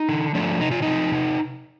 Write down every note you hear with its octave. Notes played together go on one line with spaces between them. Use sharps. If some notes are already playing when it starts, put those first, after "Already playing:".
Already playing: D#4
D3
F3 A3 D4
C3 D#4
F4
F3 C4 D#4
C3